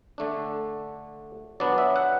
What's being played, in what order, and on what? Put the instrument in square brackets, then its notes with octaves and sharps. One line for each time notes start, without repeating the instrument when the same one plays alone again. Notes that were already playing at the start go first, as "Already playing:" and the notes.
[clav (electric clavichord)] D3 A3 D4
F#3 B3 D4 D5
E5
F#5